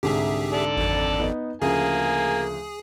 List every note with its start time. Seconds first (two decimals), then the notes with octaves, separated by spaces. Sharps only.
0.03 C2 G#2 D3 G4 G#4 E5
0.52 A4 D5
0.77 G#1 F2
1.20 B3 D#4
1.62 D2 C#3 F3 A#3 G#4 G#5